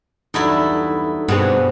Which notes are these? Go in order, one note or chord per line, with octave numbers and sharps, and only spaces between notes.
E2 G2 F#3 D#4 E4 A4
G2 B2 B3 C4 G#4